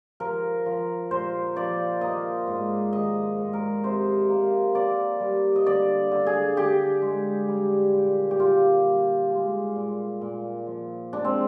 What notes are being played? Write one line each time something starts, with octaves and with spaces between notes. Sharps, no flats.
F3 A#4
F3
A#2 C5
F3 D5
A#3 D#5
G#2
D#3 D#5
G#2
A#4
C3 C5
A#3
A#3 D5
G3
D#5
D3 D5
D3
G#4
D3 G4
G#3
G3
A#2
G4
A#2 F4
G3
G#3
A#2
A#2
F3
G#3 D4
C4